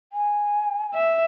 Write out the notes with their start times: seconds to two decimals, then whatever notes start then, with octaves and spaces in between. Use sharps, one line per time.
0.13 G#5
0.94 E5